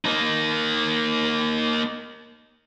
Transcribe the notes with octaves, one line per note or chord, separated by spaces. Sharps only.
A#3 D#4